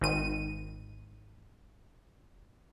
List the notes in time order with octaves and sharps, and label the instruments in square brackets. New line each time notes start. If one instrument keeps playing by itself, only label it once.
[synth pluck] G#1 D#3 D#7